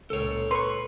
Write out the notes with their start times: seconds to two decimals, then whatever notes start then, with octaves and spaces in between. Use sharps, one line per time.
0.10 C#2 A#2 A4 C#5
0.51 B4 C6 C#6